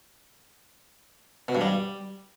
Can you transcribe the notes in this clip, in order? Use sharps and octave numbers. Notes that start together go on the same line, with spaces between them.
B2
G2
G3